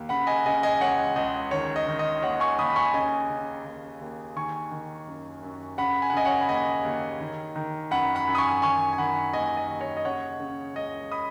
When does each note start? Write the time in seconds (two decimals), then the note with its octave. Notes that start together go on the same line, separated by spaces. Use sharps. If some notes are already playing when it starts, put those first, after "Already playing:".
Already playing: D#2
0.09 C#3 F#5 B5
0.27 D#5 G#5
0.46 C#3 D#5 G#5
0.63 D#5 G#5
0.81 C#2 C#5 F#5
1.16 C#2 D#5
1.51 D#3 C#5
1.76 D#5
1.88 D#3
1.99 D#5
2.22 D#2 C#5 F#5
2.40 G#5 C#6
2.58 D#2 B5 D#6
2.69 B5
2.76 G#5 C#6
2.93 C#3 D#5 G#5
3.30 C#3
3.65 D#2
4.01 D#2
4.36 D#3 G#5 C#6
4.71 D#3
5.07 F#2
5.43 F#2
5.78 C#3 F#5 B5
6.02 G#5
6.10 F#5
6.13 C#3 D#5 G#5
6.25 C#5 F#5
6.41 B5
6.49 D#2 D#5 G#5
6.85 D#2
7.21 D#3
7.56 D#3
7.91 F#2 F#5 B5
8.15 F#5 B5
8.28 F#2
8.35 D#6
8.38 G#5 C#6
8.62 D#3 G#5 C#6
8.93 G#5
8.98 D#3 F#5 B5
9.33 D#2 D#5 G#5
9.57 D#5
9.69 D#2
9.81 C#5
9.97 D#5
10.04 C#3 C#5 F#5
10.40 C#3
10.76 C#2 D#5
11.11 B5 D#6